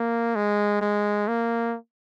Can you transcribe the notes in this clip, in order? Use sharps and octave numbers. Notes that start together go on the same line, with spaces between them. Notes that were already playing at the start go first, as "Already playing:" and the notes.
Already playing: A#3
G#3
G#3
A#3